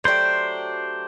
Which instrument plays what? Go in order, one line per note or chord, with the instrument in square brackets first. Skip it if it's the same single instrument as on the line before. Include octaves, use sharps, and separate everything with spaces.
[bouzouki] F#3 A3 D4 G4 [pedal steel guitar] C5